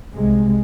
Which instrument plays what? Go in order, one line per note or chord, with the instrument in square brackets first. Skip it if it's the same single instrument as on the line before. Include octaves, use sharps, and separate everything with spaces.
[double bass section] C2 C3 G#3